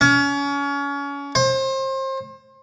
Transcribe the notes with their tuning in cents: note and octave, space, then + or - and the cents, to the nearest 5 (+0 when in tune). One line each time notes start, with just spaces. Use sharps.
C#4 +30
C5 +30